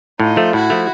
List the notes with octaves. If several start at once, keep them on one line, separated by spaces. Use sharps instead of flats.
A2 D#4 F4
F3 A3
A2 E4 F#4
F3 A3